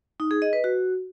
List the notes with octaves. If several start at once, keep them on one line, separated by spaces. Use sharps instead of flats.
D#4
G#4
D#5
B4
F#4